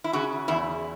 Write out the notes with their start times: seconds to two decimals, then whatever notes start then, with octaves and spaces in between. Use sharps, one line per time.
0.04 E4
0.13 C#3 F#4
0.48 E2 E4